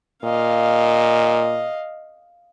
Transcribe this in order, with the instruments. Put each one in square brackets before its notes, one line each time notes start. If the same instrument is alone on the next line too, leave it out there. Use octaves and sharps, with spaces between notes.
[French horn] A#2 [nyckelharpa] D#5 F5